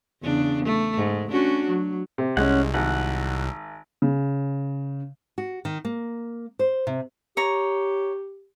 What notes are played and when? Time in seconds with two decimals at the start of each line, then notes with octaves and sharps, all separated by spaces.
0.22 E2 C#3 D4
0.65 A3
0.97 G#2
1.31 C#4 D4 F#4
1.67 F#3
2.18 C3
2.37 C2 G#3 C#4 F#5
2.74 G#1 F#5
4.02 C#3
5.38 F#4
5.65 D#3
5.85 A#3
6.59 C5
6.87 C3
7.37 G4 C#5 A#5